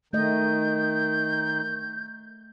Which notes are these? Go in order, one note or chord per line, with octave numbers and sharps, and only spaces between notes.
D#3 A3 D#5 G6